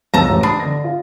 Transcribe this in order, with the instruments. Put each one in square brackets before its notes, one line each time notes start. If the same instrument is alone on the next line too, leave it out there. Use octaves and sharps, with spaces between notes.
[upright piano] C#2 E6 [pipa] A5 A#5
[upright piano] A1
[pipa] D4 [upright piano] A5 B5 D#6
[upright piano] D3 A#6
F4